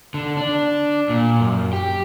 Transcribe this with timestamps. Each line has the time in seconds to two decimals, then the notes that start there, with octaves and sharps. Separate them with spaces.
0.14 D3
0.37 D4
1.10 A#2
1.40 F#2
1.73 G4